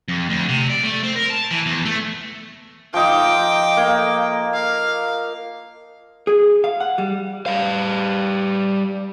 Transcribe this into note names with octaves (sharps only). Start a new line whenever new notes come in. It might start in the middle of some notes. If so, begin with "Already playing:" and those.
F2
D2
C3
D5
A3
C4
A#4
A5
E3
E2
A3
F3 D#4 G5 D6
A#3
F5
G#4
F5
F#5
G3
G3 F5